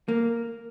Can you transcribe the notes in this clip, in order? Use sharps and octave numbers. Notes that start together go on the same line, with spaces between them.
A#3